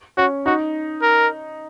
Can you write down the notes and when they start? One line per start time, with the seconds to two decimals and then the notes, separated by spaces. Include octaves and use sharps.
0.17 C#4 F#4
0.46 D#4 F#4
1.02 A#4